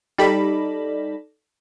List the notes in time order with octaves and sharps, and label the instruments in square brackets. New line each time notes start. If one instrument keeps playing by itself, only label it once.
[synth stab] G3 B5 [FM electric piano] D#4 A4 D5